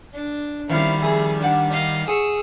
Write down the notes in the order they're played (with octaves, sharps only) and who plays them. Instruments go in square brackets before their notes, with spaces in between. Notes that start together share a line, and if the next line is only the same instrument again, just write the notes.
[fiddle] D4
[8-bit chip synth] D#3 G3 [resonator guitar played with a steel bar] C4 C#4 E4 [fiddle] F5
[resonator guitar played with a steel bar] F2 E5 [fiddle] G#4
[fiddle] D4 [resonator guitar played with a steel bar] G4 F#5
[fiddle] D#5 F5
[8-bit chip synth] G#4 [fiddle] C#6 E6